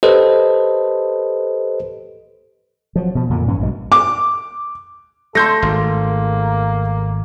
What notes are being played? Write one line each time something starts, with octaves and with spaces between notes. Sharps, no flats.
G4 A4 B4 C5 D#5
F3 F#3
B2 F3
F2 A#2 D3 D#3
G2 E3 C#4
A#1 G2 B2 G#3
D6
A3 A4 C6 G6 A#6
G#1 A#3